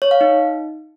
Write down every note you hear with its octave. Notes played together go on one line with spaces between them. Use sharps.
C#5
F5
D#4